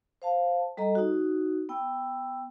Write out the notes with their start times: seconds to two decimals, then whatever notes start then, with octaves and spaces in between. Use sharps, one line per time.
0.22 C5 F5 A5
0.77 G3 A4 D#5 A#5
0.95 D#4 F#4
1.69 B3 G5 E6